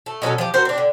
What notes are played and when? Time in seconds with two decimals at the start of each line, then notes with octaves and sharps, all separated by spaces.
0.06 A3
0.22 B2 F#3 C#4 A4
0.38 F3 G4
0.54 F#4 A#4 C5
0.65 C4 D4
0.78 D3